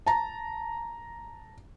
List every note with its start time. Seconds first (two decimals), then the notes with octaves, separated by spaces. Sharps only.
0.06 A5 A#5